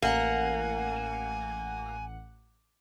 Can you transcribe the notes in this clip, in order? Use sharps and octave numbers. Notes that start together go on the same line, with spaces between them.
A1 A#3 F#5 G#5